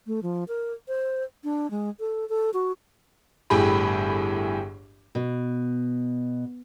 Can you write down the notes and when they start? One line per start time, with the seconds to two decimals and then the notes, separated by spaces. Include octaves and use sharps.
0.07 A3
0.23 F3
0.48 A#4
0.88 C5
1.44 D4
1.71 G#3
2.00 A4
2.29 A4
2.54 F#4
3.50 G1 A2 G4 G#4 B5
5.15 B2